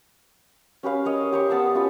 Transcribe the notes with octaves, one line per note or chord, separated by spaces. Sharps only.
C#4 G4 B4 F5
A#4 C#5 D#5
G4 C5 C#6
B3 A5 E6
C#4 F4 G4 B4